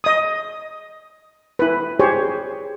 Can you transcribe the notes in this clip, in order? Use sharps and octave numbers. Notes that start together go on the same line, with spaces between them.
D#5 D#6
E4 B4
G4 G#4 C5 C#5